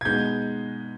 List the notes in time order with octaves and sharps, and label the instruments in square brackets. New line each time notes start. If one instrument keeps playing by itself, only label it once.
[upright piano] G#6
[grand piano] B2 G#3 B3 D#4 [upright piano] G6